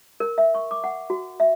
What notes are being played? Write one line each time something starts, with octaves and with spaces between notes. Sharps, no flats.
A#4
E5
C#6
D6
F#5
F#4
E5